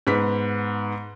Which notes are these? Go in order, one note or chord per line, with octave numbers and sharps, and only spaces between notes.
G#2 B3 B6